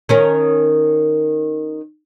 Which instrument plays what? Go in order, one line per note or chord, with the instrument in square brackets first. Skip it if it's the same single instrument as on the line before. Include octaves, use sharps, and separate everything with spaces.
[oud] D#3 C#4 A#4